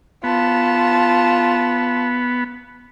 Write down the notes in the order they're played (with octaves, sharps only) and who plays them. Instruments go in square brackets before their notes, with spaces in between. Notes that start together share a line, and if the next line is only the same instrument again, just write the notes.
[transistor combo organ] B3 [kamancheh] F4 A5